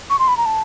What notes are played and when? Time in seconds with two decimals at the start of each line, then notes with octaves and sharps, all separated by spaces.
0.10 C#6
0.19 C6
0.28 B5
0.37 A#5
0.46 A5